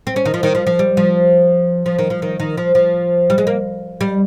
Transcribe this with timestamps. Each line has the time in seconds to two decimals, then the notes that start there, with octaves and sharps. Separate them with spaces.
0.07 C4
0.16 C#4
0.25 D#3
0.34 F3
0.43 D#3
0.55 F3
0.67 F3
0.79 G3
0.97 F3
1.86 F3
1.99 D#3
2.10 F3
2.22 D#3
2.40 D#3
2.58 F3
2.75 F3
3.30 G3
3.38 G#3
3.47 A#3
4.01 G3